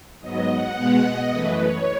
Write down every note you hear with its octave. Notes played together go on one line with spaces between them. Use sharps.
G#2 F#3 B3 D#5
F#5
B2 G#3 B3 F#5
D#5
F#2 E3 A3 B4
C#5